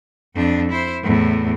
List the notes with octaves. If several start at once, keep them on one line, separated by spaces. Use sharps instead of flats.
F2 D4
E4 C5
E2 A2